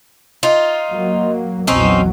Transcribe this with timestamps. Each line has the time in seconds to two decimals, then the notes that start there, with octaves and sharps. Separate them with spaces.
0.43 D#4 F4
0.89 F#3 A#3
1.67 A#1 E2 F#3 C4 C#4 D#4